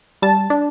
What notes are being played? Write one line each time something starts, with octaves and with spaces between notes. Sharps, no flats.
G3 A5
D4